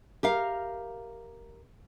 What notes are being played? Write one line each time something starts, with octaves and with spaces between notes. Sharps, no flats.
G4 A#4 F5